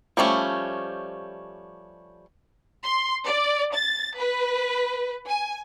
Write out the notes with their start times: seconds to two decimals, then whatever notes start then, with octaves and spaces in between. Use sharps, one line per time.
0.17 F3 G3 A3 B3 C#4
2.84 C6
3.25 D5
3.74 A6
4.16 B4
5.28 G#5